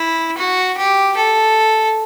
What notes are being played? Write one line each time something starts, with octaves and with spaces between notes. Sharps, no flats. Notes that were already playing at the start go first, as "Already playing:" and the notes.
Already playing: E4
F#4
G4
A4